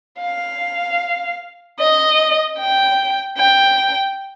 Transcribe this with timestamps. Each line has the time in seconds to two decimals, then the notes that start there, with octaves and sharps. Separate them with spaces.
0.21 F5
1.79 D#5
2.58 G5
3.37 G5